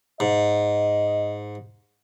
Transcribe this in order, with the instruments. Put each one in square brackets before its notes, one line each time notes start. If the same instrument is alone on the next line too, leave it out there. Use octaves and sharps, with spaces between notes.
[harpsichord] G#2 [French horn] D#5